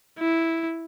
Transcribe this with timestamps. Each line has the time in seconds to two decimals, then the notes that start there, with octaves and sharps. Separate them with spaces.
0.19 E4